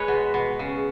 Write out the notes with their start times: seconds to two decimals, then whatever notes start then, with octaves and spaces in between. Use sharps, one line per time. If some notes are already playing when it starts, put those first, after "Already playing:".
Already playing: G#3 B4 C#5
0.08 B2
0.34 B2
0.59 C#3